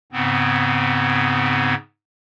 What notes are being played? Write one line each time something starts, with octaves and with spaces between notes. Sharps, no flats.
G#2 C#3 B3 C4